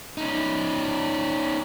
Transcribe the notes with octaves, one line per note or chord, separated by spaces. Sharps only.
C#4 D#4